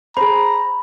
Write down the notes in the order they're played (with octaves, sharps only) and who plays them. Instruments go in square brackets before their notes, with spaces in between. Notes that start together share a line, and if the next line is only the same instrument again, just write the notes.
[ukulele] G#4 C5 [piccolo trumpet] A#5 [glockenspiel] B5